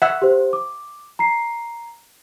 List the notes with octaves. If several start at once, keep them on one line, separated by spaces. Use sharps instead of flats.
E5 F#5
G4 C5
D6
A#5 C7